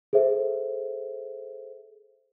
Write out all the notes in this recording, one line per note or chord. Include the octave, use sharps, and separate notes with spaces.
G#4 A4 C5 E5